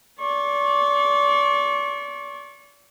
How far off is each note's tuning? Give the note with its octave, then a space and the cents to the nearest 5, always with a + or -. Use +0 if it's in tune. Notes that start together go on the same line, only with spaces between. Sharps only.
D5 -35 C#6 -35